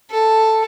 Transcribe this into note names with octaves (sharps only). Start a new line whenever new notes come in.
A4